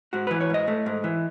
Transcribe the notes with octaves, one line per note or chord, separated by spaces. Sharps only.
G#2 F#4
E3 B4
C#5
G#2 D#5
A3
G#2
E3